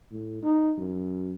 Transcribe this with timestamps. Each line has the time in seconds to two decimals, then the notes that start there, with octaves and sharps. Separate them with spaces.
0.11 A2
0.43 D#4
0.78 F#2